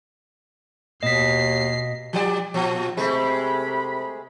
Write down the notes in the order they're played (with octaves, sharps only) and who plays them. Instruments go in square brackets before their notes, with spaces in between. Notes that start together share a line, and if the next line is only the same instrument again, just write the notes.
[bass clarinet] D#2 [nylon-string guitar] B2 [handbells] D#5 B6 [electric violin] C7
[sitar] F3 G3 D5
A#2 F3
[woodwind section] C3 B5 [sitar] G#3 A3